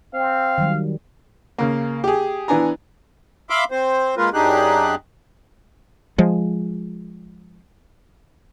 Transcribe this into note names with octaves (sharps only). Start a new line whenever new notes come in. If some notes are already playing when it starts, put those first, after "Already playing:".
C4 F5
D#3 F#3 G3
C#3 A#3
G4 G#4
E3 B3 D4 G#5 A#5
E5 F5 B5 C6 D6
C4 C5
G#3 A#3 F4 A#4 B4
F#2 D4 D#4 G4 G#4 F#6
F3 G#3